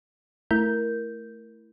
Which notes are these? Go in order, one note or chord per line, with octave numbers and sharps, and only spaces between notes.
A3 E4 A#4 G6